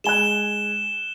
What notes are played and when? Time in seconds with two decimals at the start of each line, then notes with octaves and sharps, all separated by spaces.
0.04 G#3 G#5 F#6 E7 G7